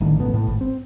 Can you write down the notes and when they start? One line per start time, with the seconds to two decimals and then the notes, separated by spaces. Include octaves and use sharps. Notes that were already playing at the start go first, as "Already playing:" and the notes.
0.01 A1 A2 D3 D#3
0.18 E1 A1 A3 B3
0.34 A2
0.47 G#1
0.61 C4